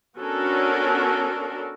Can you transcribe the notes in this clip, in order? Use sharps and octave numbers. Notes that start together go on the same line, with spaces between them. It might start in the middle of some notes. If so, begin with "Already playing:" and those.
B3 C#4 D4 F#4 A4 A#4